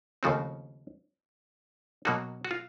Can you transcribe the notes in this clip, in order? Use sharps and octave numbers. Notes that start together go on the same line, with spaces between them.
D#2 C#3 F3 A3 C4 F#4
B2 F#3 A#3 D#4 F#4
F#4
F4